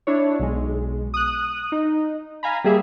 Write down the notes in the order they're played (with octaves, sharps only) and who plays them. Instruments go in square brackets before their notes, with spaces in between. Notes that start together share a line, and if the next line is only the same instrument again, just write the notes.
[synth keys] D4 E4 C#5
B1 G#3
D#6 F#6
D#4
F5 G#5 A#5 B5
G3 A#3 G#4 E5